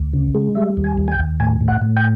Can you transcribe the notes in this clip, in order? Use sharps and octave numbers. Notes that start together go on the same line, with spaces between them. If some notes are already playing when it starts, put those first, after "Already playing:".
Already playing: D2
C#3
G#3
G3 E5
D#2
G#5
D#2
G#5
G5
D#2
A2 G#5
A2
F#5
A2
G5